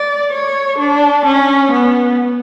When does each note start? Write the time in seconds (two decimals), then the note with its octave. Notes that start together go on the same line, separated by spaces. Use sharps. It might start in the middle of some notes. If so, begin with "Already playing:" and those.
Already playing: D5
0.33 C#5
0.79 D4
1.26 C#4
1.72 B3